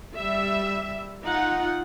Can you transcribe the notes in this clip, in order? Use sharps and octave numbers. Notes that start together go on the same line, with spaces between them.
G3 E5
D#4 F4 F#5